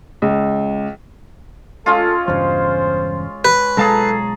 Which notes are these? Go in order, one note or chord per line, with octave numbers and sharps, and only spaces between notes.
C#2
G#3 C#4 F4 A4
E2 G2 C#3 C5
B4
B1 G#3 G#4 A4 F5 A5 A#5